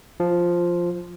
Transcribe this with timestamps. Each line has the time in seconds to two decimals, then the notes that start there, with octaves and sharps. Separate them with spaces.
0.20 F3